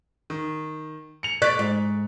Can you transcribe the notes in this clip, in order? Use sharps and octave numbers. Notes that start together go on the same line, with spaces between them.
D#3
C#7 F7
D5 C#6 F#6 B6
G#2